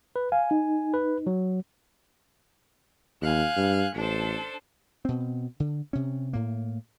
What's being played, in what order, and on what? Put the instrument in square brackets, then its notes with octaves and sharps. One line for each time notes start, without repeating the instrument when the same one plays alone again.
[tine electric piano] B4
[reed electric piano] F5 [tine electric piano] G#5
[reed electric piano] D#4
[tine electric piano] B4
F#3
[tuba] D#2 [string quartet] F5 G#5 F#6
[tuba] G2
[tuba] A1 [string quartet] D4 A4 C5
[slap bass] B2 C4
D3
C3 C#4
A2 A#3